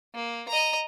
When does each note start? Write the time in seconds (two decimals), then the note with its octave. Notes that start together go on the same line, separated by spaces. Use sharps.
0.15 A#3
0.49 D#5 A#5